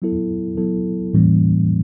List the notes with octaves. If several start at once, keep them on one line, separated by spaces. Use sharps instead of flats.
F#3 B3 E4 A4
F#3 B3 E4 A4
A2 E3 G3 A#3 C#4